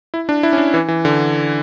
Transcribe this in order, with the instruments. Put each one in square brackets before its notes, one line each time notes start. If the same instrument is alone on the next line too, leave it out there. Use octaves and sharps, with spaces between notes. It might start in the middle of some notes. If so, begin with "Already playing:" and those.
[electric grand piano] E4
D4
E4
C#4
D4
E3
E3
D3